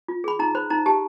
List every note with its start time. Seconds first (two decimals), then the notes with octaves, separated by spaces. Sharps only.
0.08 F4
0.24 G#4 B5
0.39 D#4 A#5
0.55 C5 B5
0.70 D#4 A#5
0.86 G4 A5